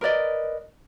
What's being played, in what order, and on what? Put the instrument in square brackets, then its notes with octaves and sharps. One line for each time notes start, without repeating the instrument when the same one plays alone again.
[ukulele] A#4 B4 D5 D#5